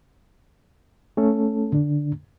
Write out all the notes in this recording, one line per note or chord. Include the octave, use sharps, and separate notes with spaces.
A3 C#4 A4
D3 D4